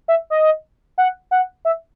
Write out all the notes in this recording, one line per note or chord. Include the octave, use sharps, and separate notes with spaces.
E5
D#5
F#5
F#5
E5